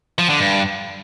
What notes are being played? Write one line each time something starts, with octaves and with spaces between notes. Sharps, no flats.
F3
D3
G2